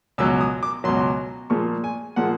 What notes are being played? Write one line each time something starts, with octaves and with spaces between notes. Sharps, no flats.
C#2 B2 F#3 E6
D#6
D6
C#2 B2 F#3 C6
A#2 F3 G#3 C#6
G#5
A#2 F3 G#3 F#5